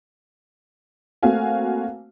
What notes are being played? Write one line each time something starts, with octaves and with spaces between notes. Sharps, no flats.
A3 A#3 C4 F#4 F5 G#5